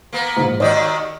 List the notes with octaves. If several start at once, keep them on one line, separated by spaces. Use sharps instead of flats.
A#3 B3
A#1 G#2
D#2 D#3 F#4 D5 D#5